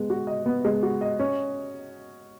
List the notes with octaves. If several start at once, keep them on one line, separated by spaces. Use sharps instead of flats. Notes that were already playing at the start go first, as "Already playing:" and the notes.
Already playing: G#3 B3
F#4
D#5
B3
G#3
F#4
D#5
C#4